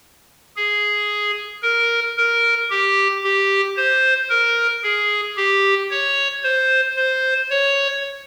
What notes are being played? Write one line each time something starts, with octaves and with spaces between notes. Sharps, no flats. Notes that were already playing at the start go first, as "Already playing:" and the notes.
G#4
A#4
A#4
G4
G4
C5
A#4
G#4
G4
C#5
C5
C5
C#5